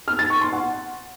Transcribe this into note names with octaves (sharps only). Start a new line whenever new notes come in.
F6
A6
C#6
C6
F#5